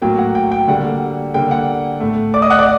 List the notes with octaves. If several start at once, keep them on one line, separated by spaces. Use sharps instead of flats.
A2 F#3 A#3 G5
F#5
G5
G5
D3 G3 A#3 F#5
D3 G3 A#3 G5
F#5
A2 A3
D5 D6
D#5 D#6
F#5 F#6
D5 D6